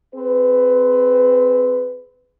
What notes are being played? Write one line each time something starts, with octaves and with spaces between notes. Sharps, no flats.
C4 G#4 B4